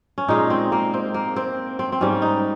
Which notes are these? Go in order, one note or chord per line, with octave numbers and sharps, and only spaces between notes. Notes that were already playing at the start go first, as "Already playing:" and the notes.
C#4
A#2 G#3 D#4
C4
A#3
C4
A#3
C4
C4
C4
G#2 G3 C#4
D#4